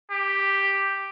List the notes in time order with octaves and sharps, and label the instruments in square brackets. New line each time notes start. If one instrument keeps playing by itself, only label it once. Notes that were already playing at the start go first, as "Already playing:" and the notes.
[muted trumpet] G4